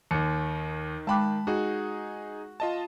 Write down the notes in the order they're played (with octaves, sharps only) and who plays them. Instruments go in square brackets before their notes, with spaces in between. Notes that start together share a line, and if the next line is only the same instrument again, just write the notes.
[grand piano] D#2 [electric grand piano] D#3 C#7
[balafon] G#3 G5 D6 [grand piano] A5 B5 F#6
[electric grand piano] D#4 G#4 [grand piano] F#4
[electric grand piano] F4 D#5 A5